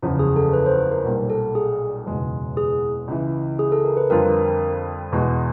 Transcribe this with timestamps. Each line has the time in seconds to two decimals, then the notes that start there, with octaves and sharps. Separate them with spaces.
0.02 F#1 E2 C#3 F3
0.19 G#4
0.36 A4
0.53 B4
0.66 C5
0.79 C5
0.91 A#4
1.05 B1 A#2 G3
1.30 A4
1.55 G#4
2.06 F#1 E2 B2 G#3
2.57 G#4
3.08 C#2 C#3 E3
3.59 G#4
3.72 A4
3.85 A#4
3.97 B4
4.10 F2 D3 G3 C4 F4 A#4
5.12 E2 B2 G#3